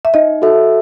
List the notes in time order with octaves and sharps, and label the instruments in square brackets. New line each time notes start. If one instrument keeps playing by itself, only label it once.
[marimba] E5
[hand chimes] D#4 [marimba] D#5
[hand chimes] F#4 A4 E5